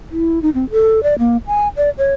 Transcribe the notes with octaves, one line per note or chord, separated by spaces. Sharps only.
E4
D#4
C4
A4
D5
A#3
G#5
D5
C#5